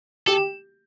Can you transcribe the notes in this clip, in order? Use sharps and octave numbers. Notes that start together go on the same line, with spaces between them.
G4 A4